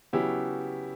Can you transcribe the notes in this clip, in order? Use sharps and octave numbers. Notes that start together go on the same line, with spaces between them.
C#3 F#3 B3 E4 G4